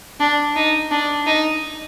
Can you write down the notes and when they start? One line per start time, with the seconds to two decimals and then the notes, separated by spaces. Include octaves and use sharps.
0.20 D4
0.56 D#4
0.91 D4
1.27 D#4